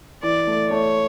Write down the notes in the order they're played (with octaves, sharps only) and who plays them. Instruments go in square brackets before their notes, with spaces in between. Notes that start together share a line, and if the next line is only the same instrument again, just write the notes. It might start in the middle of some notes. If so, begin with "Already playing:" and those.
[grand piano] E3 [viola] D5
[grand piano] A3
[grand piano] A3 [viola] C#5